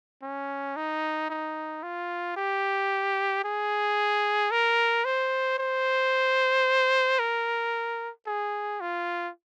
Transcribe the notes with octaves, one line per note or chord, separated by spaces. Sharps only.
C#4
D#4
D#4
F4
G4
G#4
A#4
C5
C5
A#4
G#4
F4